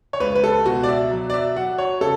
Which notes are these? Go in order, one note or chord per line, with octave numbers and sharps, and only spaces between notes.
C#5
C#2 B4
B4
A4
B2 F#4
D5
E5
F#3
D5
E5
F#3 F#5
C#5
C#3 A4